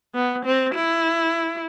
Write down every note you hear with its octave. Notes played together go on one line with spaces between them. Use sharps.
B3
C4
E4